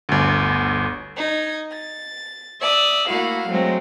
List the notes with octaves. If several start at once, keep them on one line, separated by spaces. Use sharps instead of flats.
G1 D2
D#4 G#6
A6
D5 E5 D#6
A3 A#3 E4 F#4 F5
F#3 G#3 A3 C4